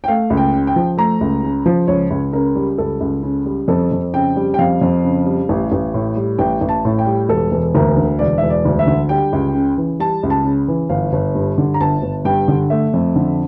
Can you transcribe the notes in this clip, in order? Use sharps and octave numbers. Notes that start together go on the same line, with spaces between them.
G5
A3 F5
C#2
G5
C#3
G5
F3
A3 A#5
C#2
C#3
F3
C#2 C#5
C#2
C#3 A#4
G3
C#2 A4
C#2
C#3
G3
F2 A4
F2
C#3 G5
G3
G5
F2 F5
F2
C#3
G3
A1
A1
A2
G3
A1 G5
A1
A5
A2
G5
G3
E1 A4
E1
D2 A#4
D3
E1 D5
E1 E5
D5
D2
E5
D3
G3 G5
C#2
C#3
E3
G3 A5
C#2
A5
C#3
E3
G1 F5
G1
G2
D3
A#5
G1 A5
G1
G2 G5
D3
A3 E5
F2
D3